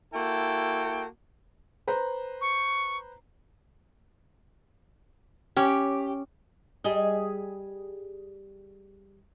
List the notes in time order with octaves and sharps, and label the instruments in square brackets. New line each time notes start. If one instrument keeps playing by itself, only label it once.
[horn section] A#3 E4 F#4 A4 G5
[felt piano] B4 C5 A#5
[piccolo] C#6
[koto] C#4 [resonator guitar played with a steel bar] G4
[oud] G3 G#4 D#5